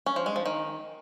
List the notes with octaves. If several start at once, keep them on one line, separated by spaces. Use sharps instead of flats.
C#4
F3
G#3
F3
D#3